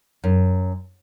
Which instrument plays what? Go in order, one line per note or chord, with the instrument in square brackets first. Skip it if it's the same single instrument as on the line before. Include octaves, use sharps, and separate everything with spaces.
[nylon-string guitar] F#2